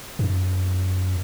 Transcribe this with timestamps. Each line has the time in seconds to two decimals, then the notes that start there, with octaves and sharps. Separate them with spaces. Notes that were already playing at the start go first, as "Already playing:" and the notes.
0.19 F#2